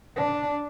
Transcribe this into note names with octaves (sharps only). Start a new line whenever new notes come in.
D4